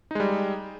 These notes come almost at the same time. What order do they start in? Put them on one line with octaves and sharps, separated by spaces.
D#4 G#3 G3